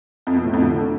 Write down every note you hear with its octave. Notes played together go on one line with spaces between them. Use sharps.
F2
B2
A2
F2
D3